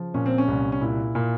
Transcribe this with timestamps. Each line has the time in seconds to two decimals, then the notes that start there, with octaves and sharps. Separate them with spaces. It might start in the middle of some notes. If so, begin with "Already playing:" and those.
Already playing: C#3 F3
0.14 A#2 C#4
0.26 C4
0.38 C#4
0.48 C2
0.72 C#4
0.81 A#2 E4
1.15 A#2